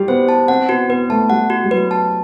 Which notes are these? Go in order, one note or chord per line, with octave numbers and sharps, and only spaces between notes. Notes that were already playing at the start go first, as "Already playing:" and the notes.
Already playing: G3 G4
B3 C5
A5
C4 F#5
B3 F#4
B3 B4
A3 A5
G3 F#5
F#4
G3
F#3 B4
A5